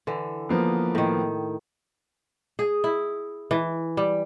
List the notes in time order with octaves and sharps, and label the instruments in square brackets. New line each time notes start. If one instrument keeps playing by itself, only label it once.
[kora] D3 E3
[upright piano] F3 A#3 B3
[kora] A2 D#3
G#4
E4
E3
G3